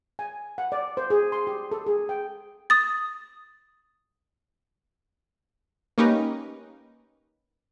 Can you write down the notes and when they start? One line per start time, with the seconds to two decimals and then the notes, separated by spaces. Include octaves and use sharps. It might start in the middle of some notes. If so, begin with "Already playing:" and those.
0.19 G#5
0.58 F#5
0.72 D5
0.97 C5
1.10 G#4
1.32 C6
1.47 G4
1.71 A4
1.86 G#4
2.09 G5
2.70 D#6 A6
5.98 A#3 C#4 D#4 G4 A#4 B4